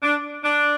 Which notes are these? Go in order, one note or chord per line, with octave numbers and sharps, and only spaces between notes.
D4
D4